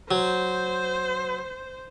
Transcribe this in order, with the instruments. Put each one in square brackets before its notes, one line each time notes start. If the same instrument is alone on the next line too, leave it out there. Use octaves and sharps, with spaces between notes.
[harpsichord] F#3 [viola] C5